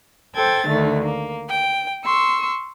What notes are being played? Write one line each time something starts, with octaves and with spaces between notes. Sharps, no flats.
A4 C5 G5 G#6 A6
D2 D3 D#3 A3
A#3
G5
C6 C#6 E6